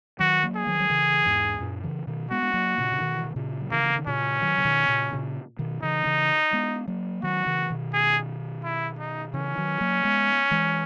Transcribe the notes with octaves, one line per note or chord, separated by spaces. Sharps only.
D#3 F#3 F#4
F#3 A#3
G#4
D#3 F#3
F#3
C#3 E3
E2 G#2
F#2 A#2
C#3 E3
B2 D#3
G#3 B3 F#4
G#3
F#3 A#3
A#2 C#3
C#3
B2 D#3
E3
D#3
A#2 C#3
F#3
C#3 E3 A#3
E3
D#3
A#2 C#3 C#4
D#3 F#3
C#3
B2 D#3
A#2 C#3
A#2 C#3
B2 D#3
C#3 E3 D#4
C#3 E3
G#3 B3
F#3 A#3
D#3 F#3 F#4
C#3 E3
B2 D#3
G#4
E4
D#4
C#3 E3 C#4
D#3 F#3
F#3 A#3
G#3 B3
E3 G#3